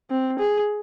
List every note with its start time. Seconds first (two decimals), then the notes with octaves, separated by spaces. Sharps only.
0.11 C4
0.39 G#4